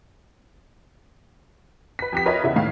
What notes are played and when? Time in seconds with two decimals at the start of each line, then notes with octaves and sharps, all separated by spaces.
1.99 B4 B6
2.13 F2 G4 B6
2.26 F4 A#4 B4 C#5 D#5 E5
2.43 E2 C#3 E4
2.56 A2 D#3 F5 C7